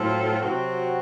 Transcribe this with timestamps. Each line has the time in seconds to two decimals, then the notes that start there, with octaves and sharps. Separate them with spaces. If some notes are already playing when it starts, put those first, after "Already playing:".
Already playing: A2 F#3 C4 F4 A4
0.38 C3 F#3 C4 F#4